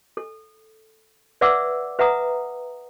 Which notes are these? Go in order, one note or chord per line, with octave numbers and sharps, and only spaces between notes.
A4
B4 D5 E5 F#5 D6 E6
B4 E5 F#5 A#5 D#6